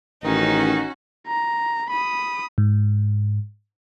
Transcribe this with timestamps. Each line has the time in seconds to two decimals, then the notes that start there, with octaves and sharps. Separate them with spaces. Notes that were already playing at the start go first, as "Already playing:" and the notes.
0.24 A1 D#3 C#4 D#4 F#4
1.27 A#5
1.90 B5 D#6
2.58 G#2